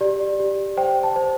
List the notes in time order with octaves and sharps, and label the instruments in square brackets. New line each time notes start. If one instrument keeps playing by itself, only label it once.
[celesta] G4 D5
G4
C5 G5
A5
C5